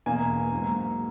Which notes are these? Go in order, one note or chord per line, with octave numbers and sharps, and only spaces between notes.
E2 B2 A#3 G#5
G#2 F#3 A#3